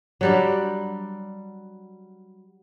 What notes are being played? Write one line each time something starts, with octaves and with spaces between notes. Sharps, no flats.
F#3 G3 D4